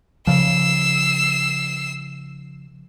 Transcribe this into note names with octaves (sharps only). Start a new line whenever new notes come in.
C#3 F3 E6 C7